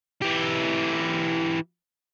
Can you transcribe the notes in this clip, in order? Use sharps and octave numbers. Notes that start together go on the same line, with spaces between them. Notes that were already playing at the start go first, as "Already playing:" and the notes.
E3 G4